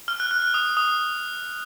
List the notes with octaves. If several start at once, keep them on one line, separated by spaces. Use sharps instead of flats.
F6
F#6
F#6
F#6
D#6
D#6